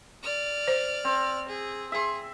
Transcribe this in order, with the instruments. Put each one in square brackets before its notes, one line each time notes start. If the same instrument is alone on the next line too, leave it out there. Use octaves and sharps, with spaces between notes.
[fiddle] D5 F6
[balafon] C5
[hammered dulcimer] C4
[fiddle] G#4
[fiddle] G#4 [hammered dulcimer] E5 C6